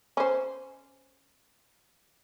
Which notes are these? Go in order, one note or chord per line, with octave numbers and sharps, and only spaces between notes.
C#4 C5